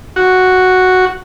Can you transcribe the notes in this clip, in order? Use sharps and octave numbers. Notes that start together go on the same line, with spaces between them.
F#4